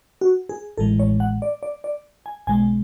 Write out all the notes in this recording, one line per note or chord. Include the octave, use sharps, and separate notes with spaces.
F#4
G#4
A1 A2 E3 G#3 A4
C#5
F#5
D5
D5
D5
G#5
B1 B2 G#3 G#5